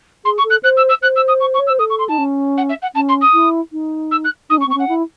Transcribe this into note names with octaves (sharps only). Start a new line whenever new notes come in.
G#4 C6
C#6
A4
F#6
C5 F#6
E6
E6
C5 F#6
E6
D#6
C#6
C#6
C#5
E6
C5
A4 D#6
C#6
C6
D#4 A5
C#4
F#5
E5
F#5
C#4 A5
C6
D#6
E4
D#4
E6
F#6
D#4 D#6
C#4 C#6
C4
C#6
C#4 F#5
E4